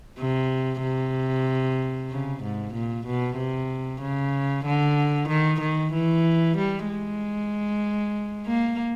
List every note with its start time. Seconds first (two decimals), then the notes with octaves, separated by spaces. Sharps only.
0.19 C3
0.83 C3
2.10 C#3
2.43 G#2
2.74 A#2
3.06 B2
3.37 C3
4.02 C#3
4.66 D3
5.29 D#3
5.61 D#3
5.93 E3
6.57 G3
6.89 G#3
8.47 A#3